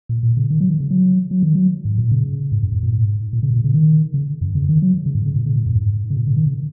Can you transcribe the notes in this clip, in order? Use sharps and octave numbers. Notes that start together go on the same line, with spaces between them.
A#2
A#2
C#3
D#3
F#3
D#3
C#3
F#3
F#3
D#3
F#3
G#2
A#2
C#3
G#2
F#2
G#2
A#2
G#2
A#2
C#3
A#2
C#3
D#3
C#3
F#2
C#3
D#3
F#3
C#3
G#2
C#3
A#2
C#3
A#2
F#2
G#2
C#3
A#2
C#3
D#3
C#3